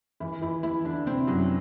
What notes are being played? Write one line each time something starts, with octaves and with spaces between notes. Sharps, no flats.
E3 E4
E3 E4
E3 E4
D3 D4
C3 C4
F#2 F#3